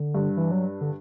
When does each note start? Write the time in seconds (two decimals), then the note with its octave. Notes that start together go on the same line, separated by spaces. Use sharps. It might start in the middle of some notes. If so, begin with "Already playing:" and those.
Already playing: D3
0.15 G2
0.37 E3
0.51 F#3
0.81 D3